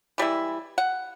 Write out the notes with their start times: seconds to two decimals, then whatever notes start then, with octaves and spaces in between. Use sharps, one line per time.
0.18 E3 G3 G#3 E4
0.78 F#5